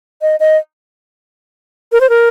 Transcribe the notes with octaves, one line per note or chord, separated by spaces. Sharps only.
D#5
D#5
A#4
C5
A#4